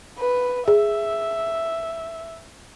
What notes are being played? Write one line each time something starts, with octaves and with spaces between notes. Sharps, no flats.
B4
G#4 E5